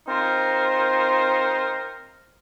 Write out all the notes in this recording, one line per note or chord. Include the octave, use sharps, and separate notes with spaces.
C4 D#4 F4 A#4 C5